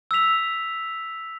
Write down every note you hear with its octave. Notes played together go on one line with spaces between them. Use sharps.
E6 B6 F7